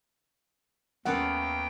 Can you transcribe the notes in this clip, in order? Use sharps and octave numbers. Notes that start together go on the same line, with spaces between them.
D#2 A3 B3 C#4 F4 A#4 F#5 G5